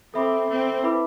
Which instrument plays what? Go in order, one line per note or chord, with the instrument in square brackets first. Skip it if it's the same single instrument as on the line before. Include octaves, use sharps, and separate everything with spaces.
[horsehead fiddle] C4 [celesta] A4 E5 B5 D6
[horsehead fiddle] C4
[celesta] E4 B4 E5 B5 D6